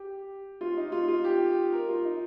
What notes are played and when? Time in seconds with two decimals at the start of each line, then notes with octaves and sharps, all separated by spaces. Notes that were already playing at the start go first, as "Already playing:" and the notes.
Already playing: G4
0.61 F4
0.77 D#4
0.92 F4
1.08 F4
1.24 G4
1.73 A#4
1.89 F4
2.05 D#4